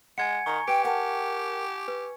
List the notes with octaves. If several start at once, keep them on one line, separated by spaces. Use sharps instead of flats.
G#3 F#5 G#5 G#6 C#7
D#3 A#5 C#6
G4 B4 G5 D7
A#4 F#5 G5 A5
B4